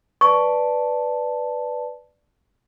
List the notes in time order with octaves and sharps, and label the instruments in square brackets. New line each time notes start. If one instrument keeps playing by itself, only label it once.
[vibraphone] B4 D5 A5 [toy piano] C#6